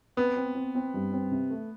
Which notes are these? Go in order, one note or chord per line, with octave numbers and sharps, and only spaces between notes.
B3 C4
C4
C4
C4
G2
C4
C3
A3